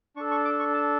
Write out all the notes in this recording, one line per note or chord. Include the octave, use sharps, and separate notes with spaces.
D4 A4 C#6
C#6
D6
C#6
A5